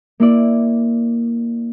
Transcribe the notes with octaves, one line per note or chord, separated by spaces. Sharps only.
A#3 E4 D5